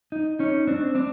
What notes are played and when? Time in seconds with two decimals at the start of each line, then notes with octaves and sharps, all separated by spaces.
0.12 D#4
0.39 C#4 D#4
0.67 C4 D4
0.95 C4 D4